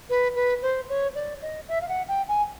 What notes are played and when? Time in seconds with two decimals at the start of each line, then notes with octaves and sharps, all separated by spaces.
0.10 B4
0.36 B4
0.62 C5
0.89 C#5
1.15 D5
1.42 D#5
1.68 E5
1.81 F5
1.88 F#5
2.08 G5
2.28 G#5